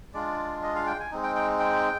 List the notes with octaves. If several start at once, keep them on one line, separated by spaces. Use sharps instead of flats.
G#3 D4 F4 D5
D#5
F5
G5
G#5
G#3 C4 D#4
G5
G5
G5